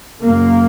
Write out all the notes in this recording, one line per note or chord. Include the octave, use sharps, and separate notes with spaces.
F#2 C#3 A#3